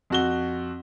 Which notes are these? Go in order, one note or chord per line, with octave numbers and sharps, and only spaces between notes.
F2 F#4 G7